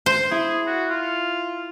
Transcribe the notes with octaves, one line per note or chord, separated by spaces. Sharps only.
C5
E4 G#4
F#4
F4